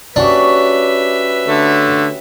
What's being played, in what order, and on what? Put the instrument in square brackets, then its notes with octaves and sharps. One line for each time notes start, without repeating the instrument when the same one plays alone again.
[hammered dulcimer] C#4 F#4 G4 [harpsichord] D4 [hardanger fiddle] B4 E5
[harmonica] D3 A3